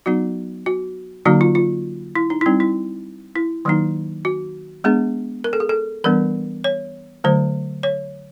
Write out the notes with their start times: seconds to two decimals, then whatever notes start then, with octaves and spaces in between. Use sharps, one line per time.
0.06 F#3 B3 D#4 F#4
0.66 F#4
1.25 D3 F#3 A#3 D#4 F#4
1.41 F4
1.55 F4
2.15 E4
2.30 D#4
2.41 E4
2.46 G3 C4 D#4
2.60 E4
3.36 E4
3.65 D#3 F#3 A#3 D#4
4.25 F#4
4.84 G#3 B3 D4 G#4
5.44 A#4
5.53 A4
5.60 G#4
5.69 A4
6.04 E3 G3 B3 D4 A#4
6.64 C#5
7.24 D3 F#3 A3 C5
7.83 C#5